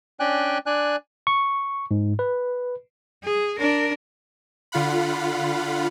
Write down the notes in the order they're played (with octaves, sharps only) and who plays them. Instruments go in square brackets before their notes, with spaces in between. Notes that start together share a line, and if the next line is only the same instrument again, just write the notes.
[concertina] C#4 D4 D5 G5 G#5 F#6
D4 D5 G#5 F#6
[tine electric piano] C#6
G#2
B4
[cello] G#4
D4 A#4
[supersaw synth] D3 F4 F5 F#5 B5